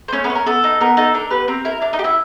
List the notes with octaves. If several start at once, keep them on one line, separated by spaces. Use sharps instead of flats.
C5
A3 C#4 C#5
B3 B4
C#4
A#4
B3 A4
D#4
B3 A#4
D#4 A4
D4 A#4
B3 G4 B4
C4 A#4
E4 A#4
D4 A#4
D#4 D#5
G4
E4 E5